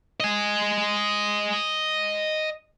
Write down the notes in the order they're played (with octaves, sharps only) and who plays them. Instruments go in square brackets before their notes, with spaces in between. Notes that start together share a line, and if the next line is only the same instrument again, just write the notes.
[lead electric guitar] D#5 G#5